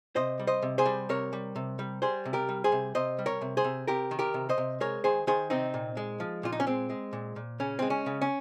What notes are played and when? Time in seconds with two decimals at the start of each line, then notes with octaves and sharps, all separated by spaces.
0.16 C3 C5 D#5
0.39 G3
0.47 C5 D#5
0.62 C3
0.78 G#4 C5
0.86 G3
1.09 C3 A#4 C#5
1.33 G3
1.56 C3
1.79 G3
2.02 G3 G#4 C5
2.25 C3
2.33 G4 A#4
2.49 G3
2.64 G#4 C5
2.72 C3
2.95 C3 C5 D#5
3.19 G3
3.26 A#4 C#5
3.41 C3
3.57 G#4 C5
3.64 C3
3.87 C3 G4 A#4
4.11 D#3
4.19 G4 A#4
4.34 C3
4.49 C5 D#5
4.58 C3
4.80 G#3 A#4 C#5
5.04 D#3 G#4 C5
5.27 D#3 G#4 C5
5.50 C3 C4 D#4
5.74 A#2
5.97 G#3
6.20 F3
6.43 A#2 F4
6.52 D#4
6.60 C#4
6.67 G#3 C4
6.90 G#3
7.13 A#2
7.36 A#2
7.60 C#3 C#4
7.79 G#3 C4
7.90 C#4
8.06 C#3
8.21 C#4